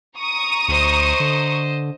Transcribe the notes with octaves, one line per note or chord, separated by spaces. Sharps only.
A#5 C#6 D#6
D2 C5 D#5
D3